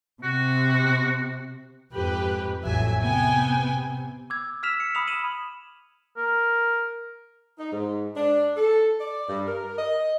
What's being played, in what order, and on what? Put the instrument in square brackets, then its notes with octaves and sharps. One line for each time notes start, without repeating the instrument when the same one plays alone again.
[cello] C3 [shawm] F#4
[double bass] F2 G#2 [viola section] G4 B4
[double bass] A1 F2 [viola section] F#3 E5 G#5
[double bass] C3 [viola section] B3 G5 G#5
[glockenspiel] D6 E6 G#6
E6 F6 B6 E7 F7
C#7
B5 D#6 F7
D#7 E7 F#7
[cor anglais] A#4
[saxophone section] D#4
G#2
D4
A4
D5
G2
A#4
D#5